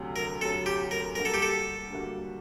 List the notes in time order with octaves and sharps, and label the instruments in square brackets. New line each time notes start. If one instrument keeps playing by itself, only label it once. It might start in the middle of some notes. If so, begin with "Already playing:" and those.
Already playing: [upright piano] D2 C3 F#3
[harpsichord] A#4
[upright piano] D2 C3 F#3 [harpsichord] A4
[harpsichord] G4
A#4
[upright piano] D3 G3 A#3 F#4 [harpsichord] A#4
[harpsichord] A4
G4
A4
[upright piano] D3 G3 A#3 F#4